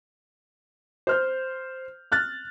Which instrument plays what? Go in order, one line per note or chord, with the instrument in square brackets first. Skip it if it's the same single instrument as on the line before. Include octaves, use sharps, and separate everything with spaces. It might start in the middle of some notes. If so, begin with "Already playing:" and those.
[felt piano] C5 F6 G6
F6 F#6 A6